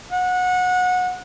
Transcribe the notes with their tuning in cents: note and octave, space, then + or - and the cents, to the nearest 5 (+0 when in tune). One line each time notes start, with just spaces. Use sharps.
F#5 -25